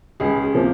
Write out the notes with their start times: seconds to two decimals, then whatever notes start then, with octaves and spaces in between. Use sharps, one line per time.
0.20 C#2 G#4
0.43 G#4
0.54 C3 F3 A#3